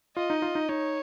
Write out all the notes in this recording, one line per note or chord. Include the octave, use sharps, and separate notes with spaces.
F4 D#5
D#4
F4
D#4
D#4 C#5